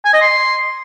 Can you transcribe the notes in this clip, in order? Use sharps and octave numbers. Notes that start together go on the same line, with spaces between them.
G#5
D#5
C6